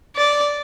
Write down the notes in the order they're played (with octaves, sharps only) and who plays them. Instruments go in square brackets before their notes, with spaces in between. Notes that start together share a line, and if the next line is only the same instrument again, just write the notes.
[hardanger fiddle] D5